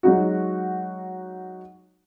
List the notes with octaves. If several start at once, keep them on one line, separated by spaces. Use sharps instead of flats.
F#3 G#3 D#4 F#4